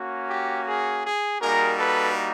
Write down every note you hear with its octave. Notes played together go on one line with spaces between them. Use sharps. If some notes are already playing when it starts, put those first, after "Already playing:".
Already playing: A#3 C#4 F#4
G4
G#4
G#4
G3 A#3 D#4 F#4 G#4 A#4
A4 B4